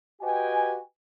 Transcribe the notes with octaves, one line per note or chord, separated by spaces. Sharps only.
F#4 G4 B4 D#5 G5 G#5